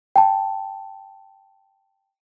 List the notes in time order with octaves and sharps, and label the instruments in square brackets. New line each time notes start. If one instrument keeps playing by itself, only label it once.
[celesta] G5 A5